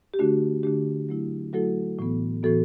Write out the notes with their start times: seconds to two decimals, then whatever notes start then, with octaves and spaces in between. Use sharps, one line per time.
0.14 G4
0.19 D3 A3 D4 F#4
0.63 D3 A3 D4 G4
1.09 F#3 A3 E4
1.53 F#3 A3 E4 F#4 A4
1.99 A2 E3 B3
2.43 A2 E3 B3 F#4 A4